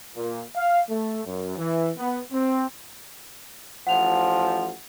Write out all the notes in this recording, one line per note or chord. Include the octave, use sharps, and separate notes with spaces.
A#2
F5
A3
F#2
E3
B3
C4
A1 F3 F#5 F7